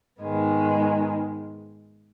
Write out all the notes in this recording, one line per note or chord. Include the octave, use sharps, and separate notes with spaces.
G#2 D#3 G#3 B3